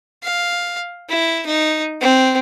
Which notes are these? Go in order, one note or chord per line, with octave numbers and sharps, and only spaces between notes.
F5
E4
D#4
C4